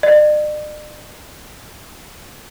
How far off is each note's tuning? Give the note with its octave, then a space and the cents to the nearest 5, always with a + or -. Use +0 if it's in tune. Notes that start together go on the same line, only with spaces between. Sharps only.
D5 +45